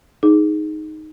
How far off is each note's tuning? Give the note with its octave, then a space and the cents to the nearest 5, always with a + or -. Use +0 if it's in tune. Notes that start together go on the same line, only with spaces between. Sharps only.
D#4 +0 G#4 +10